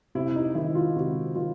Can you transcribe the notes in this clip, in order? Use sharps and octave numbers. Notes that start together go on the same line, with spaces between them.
C3 E4
D#4
D#3 E4
F4
C3 F#4
D#3 F4